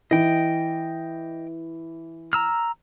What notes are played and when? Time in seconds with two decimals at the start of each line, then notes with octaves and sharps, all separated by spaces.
0.11 E3 D#5 G5
2.33 A#5 E6 F6